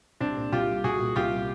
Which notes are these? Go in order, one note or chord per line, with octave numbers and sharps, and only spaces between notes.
C2 C4 D4
A#2
C2 F4 G4
G3
C2 F#4 G#4
A#2
C2 F4 G4
G3